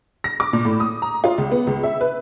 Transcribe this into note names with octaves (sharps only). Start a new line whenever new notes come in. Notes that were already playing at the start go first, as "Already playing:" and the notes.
A#6
D6
A#2
A2
D#6
A#5
F4
C#2
B3
C#2
E5
B4